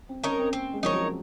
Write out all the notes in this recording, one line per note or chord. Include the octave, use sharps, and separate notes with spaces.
C4
C#4 D#4 A#4 C#5
C4
A#3 C4
G#3
F3 D#4 A#4 C#5
F#3